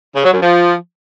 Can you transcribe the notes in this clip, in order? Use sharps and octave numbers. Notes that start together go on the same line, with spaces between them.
C#3
F#3
F#2
F3